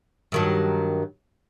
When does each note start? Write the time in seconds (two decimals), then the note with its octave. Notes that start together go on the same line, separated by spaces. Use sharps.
0.32 G2 D#3 F#3